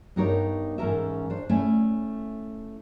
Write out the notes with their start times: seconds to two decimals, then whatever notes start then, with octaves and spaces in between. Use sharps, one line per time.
0.16 G2 B3 D#4 G4 A#4 C#5
0.78 G#2 E3 C#4 A4 A#4 E5
1.30 D4 C5
1.49 A3 C#4 E4